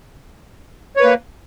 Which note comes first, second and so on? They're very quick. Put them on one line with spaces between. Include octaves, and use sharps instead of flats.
C#5 B4 A#3